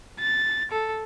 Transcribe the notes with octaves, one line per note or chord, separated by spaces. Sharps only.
A6
A4